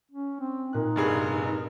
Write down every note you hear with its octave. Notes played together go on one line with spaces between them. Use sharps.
C#4
C4
A#2 D#4 F#6
F1 G2 G#4 G#5 C6 D#6